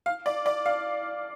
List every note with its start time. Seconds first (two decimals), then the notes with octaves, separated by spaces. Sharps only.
0.06 F5
0.26 D5
0.46 D5
0.66 F5